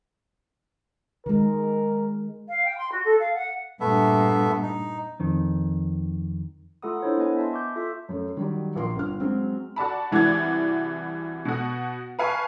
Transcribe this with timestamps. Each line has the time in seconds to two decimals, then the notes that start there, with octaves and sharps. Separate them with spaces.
1.26 D#3 G#3 A#4
2.48 F5
2.64 G5
2.77 C6
2.91 F#4
3.04 A4
3.19 F5
3.34 F#5
3.80 G2 A#2 A3 B3 E5
4.62 D#4
5.20 F2 D#3
6.82 A3 F4 A4 F#5 A#5 D#6
7.02 D4 E4 A4 C5 C#5
7.18 B3 B4 D#5 G#5
7.37 E5 A5 C6
7.53 C#6 D6 G6
7.76 F4 A4 E5 B6
8.09 F#2 A3
8.37 D#3 F#3 G3
8.75 A#1 A#4 C6
8.96 G1 F6
9.20 F#3 G#3 C4
9.76 F#4 D5 A5 B5
10.11 C2 E3 F#4 D5 G#6
11.45 B2 F#4
12.19 B4 F5 G#5 A5 B5 C#6